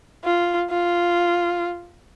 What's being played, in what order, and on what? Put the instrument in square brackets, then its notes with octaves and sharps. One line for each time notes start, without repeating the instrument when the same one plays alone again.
[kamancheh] F4
F4